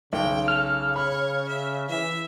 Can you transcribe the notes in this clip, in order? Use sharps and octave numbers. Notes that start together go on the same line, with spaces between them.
B1 C#3 G5
A4 F6
C#5 B5
E5
E3 E5